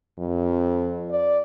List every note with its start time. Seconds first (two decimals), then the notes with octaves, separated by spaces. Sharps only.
0.18 F2
1.11 D5